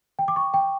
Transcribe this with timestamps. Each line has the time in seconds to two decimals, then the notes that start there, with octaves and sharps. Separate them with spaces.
0.19 G5
0.28 D6
0.36 C#6
0.54 G5